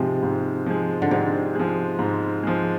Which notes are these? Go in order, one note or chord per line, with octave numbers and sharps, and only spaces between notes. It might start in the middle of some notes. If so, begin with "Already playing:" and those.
Already playing: G#2 C3 F3 G#3
G#2
F3 G#3
D3
G#2 C3
F3 G#3
G#2
F3 G#3